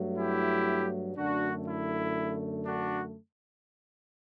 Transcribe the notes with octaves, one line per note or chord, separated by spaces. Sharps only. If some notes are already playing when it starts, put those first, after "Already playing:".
Already playing: G2 F#3 A3
E4 G4
F#2 D3 A3 D4 F#4
E4
D4 F#4